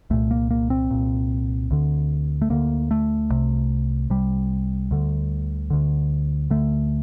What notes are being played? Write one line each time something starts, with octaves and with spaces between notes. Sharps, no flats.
C2 A#2 A3
A#3
A#3
C4
C2 A#2
D2 D3
A3
D2 D3 A#3
A3
C2 C3
C2 C3 G3
D2 D3
D2 D3
D2 D3 A3